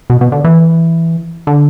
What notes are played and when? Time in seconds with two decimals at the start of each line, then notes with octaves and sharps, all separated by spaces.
0.10 B2
0.21 B2
0.32 D3
0.44 E3
1.47 D3